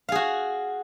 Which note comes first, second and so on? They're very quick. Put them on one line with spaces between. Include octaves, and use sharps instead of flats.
F5 G#4 F#4